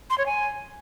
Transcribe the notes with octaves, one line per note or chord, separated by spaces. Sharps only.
C6
C#5
G#5